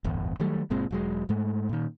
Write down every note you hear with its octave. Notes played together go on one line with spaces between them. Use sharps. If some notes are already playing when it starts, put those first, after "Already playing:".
D1 G1 E2
D#3 F#3 G3 A3
F#1 A#2 G#3 C4
E1 F#3 G#3
G#2 G#3 A3
A#2 D#3